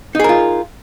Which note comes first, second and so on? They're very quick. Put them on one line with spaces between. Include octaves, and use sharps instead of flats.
D#4 G#4 A#4 F4